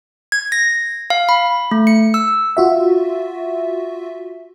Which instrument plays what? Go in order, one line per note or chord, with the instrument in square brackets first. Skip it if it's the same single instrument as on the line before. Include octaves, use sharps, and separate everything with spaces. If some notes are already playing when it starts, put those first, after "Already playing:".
[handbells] G#6
A#6
F5
B5
A3
C#7
E6
[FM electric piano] F4 F#4 E5